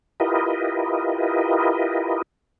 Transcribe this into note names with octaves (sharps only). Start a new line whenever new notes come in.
E4 F4 G4 A#4 B4 D#5